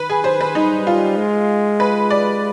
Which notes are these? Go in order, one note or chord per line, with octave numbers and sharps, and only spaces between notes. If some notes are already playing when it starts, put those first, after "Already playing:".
Already playing: D#3 B4
G#4
C5
B4
G3 D#4
F4
G#3
B4
D5